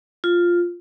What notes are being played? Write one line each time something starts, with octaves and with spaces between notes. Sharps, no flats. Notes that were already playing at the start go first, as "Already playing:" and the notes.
F4